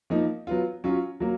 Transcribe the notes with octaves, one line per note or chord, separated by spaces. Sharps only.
F3 A#3 D#4
F#3 B3 F4
F#3 C#4 F4
F#3 A#3